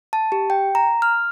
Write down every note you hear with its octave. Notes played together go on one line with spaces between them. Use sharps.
A5
G4
G5
A#5
F6